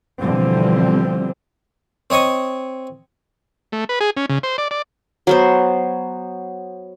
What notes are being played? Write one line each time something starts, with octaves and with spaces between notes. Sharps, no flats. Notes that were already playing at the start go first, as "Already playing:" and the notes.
B2 D3 E3 F3 G3 C4
C4 C#5 D#5 C#6 D#6
A3
B4
G#4
C#4
C#3
C5
D5
D5
F#3 B3 C5